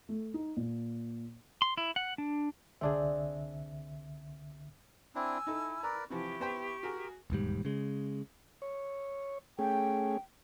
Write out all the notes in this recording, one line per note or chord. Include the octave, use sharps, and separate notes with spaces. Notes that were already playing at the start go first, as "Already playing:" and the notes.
A3
D#4
A#2
C6
E4
F#5
D4
C2 D3 C4 D4 G#4 E5
C4 D4 E4 G#5 E6
D#4 E4 A4
A#4 B4 D5 A#5
C3 E3 F3 E4 G4 C#6
B3 C5 G5
F#4 G#4 A#4
E1 D#2 G#2 G3
C#3 G#3
C#5
A3 C#4 G#4 G5